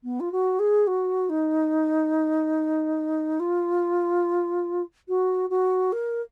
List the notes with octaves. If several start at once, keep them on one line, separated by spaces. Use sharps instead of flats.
B3
F4
F#4
G#4
F#4
D#4
F4
F#4
F#4
A#4